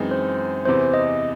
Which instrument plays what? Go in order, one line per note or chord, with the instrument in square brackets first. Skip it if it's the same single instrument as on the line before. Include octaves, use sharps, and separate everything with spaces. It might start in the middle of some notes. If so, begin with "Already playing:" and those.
Already playing: [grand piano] F#2 E3 G#3 C4 D#4
[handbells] C5
[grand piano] E2 C3 E3 [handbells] C5
[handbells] D#5